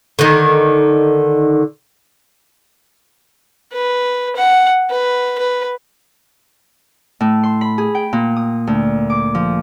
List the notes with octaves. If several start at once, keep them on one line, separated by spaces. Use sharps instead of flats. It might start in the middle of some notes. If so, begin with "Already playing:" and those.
D3 D#3
B4
F#5
B4
B4
A2
C6
B5
G#4
G5
A#2
D#6
D2
D6
F3